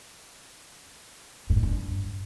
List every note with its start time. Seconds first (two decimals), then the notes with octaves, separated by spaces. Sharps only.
1.50 G2
1.56 A2
1.63 G2